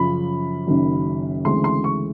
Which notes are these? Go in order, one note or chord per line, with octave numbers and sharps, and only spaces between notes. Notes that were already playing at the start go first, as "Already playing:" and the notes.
Already playing: F#2 C#3 F3 B5
F#1 F#2 D#3 F#3
D2 C#3 E3 G#3 C4 C6
C6
C#6